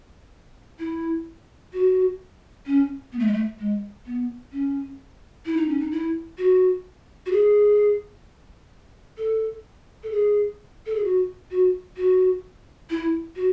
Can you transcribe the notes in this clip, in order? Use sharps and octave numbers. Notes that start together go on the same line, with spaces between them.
E4
F#4
C#4
B3
A3
G#3
A3
G#3
B3
C#4
E4
D#4
C#4
D#4
E4
F#4
F#4
G#4
A4
A4
G#4
A4
G#4
F#4
F#4
F#4
E4
F#4